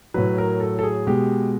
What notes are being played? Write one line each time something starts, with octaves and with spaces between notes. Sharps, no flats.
A2 F#3 B4
A#4
A4
A4
G#4
B2 G#3 G4